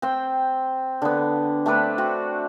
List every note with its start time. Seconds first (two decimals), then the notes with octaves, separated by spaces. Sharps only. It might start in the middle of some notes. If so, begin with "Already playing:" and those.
0.02 C4 G5
1.02 D3 B3
1.66 A3 C4 D4 B4
1.98 C4 F#4